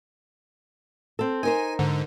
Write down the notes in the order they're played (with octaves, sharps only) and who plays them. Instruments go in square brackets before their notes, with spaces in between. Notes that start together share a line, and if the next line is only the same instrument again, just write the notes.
[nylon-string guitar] C4 A4
[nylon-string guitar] D#4 A#4 C5 [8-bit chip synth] G#5
[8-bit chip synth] G#2 D3